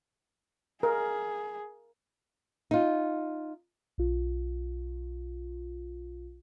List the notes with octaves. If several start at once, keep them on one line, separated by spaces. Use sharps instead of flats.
G#4 A#4
D#4 F4
B1 F4